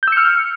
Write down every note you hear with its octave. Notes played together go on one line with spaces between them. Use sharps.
E6 F6 G6 C#7